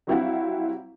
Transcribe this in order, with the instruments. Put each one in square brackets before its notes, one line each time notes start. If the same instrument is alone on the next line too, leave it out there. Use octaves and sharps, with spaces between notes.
[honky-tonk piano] F#3 G3 C4 E4 F5 F#5